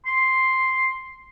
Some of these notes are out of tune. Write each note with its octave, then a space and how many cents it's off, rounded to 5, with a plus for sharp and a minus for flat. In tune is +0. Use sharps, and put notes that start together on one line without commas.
C6 +0